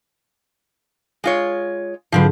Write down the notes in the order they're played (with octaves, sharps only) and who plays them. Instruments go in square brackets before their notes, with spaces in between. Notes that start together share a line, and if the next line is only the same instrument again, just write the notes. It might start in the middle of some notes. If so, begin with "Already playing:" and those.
[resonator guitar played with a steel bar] G#3 F4 C#5
[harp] G#2 D3 F#3 [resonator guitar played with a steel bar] F3 C4 B4